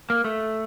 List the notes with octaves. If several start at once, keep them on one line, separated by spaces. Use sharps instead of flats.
A#3
A3